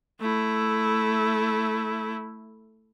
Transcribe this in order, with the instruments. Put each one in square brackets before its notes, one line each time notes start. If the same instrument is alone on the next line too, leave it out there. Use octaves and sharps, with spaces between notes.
[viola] A3 E4